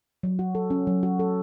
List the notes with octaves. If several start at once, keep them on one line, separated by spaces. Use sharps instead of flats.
F#3
F#4
A4
C#4
F#3
F#4
A4